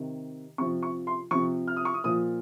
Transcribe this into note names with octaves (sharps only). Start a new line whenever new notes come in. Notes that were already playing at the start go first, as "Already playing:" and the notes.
Already playing: C3 D#3
C3 F3 C#6
C#6
C6
C3 F3 C#6
F6
D#6
C#6
D#6
A#2 F3 D#6